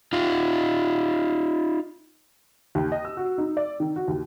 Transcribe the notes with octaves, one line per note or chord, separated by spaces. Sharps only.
D#4 F4
D#2
D#5
E6
F#4
D#4
D5
D#3
F#4
D#2